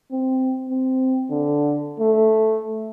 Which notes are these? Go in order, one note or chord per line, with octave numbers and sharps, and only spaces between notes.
C4
C4
D3
A3